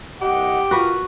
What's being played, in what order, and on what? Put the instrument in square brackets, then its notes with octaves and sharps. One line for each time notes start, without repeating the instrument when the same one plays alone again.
[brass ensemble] C2 D#5 F#5 [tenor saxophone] G4
[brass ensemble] F4 A#4 [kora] F#4 B4